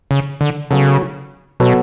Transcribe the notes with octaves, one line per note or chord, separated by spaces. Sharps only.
C#3
D3
C#3 F#3 B3 F#4 A4
B2 F#3 B3 F#4 A4